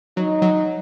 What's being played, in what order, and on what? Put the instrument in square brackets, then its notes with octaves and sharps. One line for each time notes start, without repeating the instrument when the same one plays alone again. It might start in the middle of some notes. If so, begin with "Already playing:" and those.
[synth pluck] F#3 [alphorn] D#4
[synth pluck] F#3